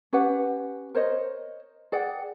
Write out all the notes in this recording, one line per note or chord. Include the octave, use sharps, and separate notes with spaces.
C#4 G4 B4 F#5
A#4 C5 C#5 D#5
G#4 D5 F#5 G5